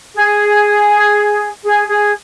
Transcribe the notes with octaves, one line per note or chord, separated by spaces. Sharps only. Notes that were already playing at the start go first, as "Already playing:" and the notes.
G#4
G#4
G#4